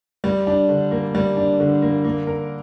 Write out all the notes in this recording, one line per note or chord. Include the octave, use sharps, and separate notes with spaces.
G3
D4
D3
A#3
G3
D4
D3
A#3
A#3
A#4